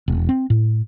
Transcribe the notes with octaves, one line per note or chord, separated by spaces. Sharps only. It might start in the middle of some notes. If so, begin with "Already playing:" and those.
E1
C4
A2